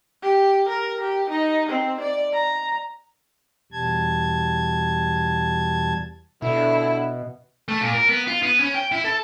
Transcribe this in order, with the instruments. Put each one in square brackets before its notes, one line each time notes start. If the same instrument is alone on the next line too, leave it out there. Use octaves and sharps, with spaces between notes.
[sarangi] G4
A#4
G4
D#4
C4
D5
A#5
[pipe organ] E2 B2 G3 A5 G#6
[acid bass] B2 [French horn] D3 [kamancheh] E4
[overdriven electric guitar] A3
A#2
A#4
B3
F4
B3
C#4
G5
E4
A4